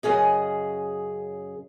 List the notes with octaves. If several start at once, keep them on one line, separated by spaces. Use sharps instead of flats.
F#2 C#3 G#4 D#5